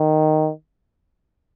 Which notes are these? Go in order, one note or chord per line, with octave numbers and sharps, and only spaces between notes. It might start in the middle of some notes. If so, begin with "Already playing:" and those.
Already playing: D#3